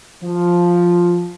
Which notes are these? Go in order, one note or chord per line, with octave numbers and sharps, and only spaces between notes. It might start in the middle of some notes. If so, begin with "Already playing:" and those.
F3